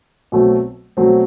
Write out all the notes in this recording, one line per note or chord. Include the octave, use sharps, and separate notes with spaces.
B2 F#3 A3 C4
B2 F#3 A3 C4